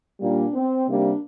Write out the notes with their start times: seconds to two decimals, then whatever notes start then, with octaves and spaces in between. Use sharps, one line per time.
0.20 A#2 G3 A#3 D4
0.53 C4
0.87 C3 G3 A#3 D4